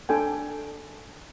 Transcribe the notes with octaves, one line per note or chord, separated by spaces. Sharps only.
D4 A4 G5 G#5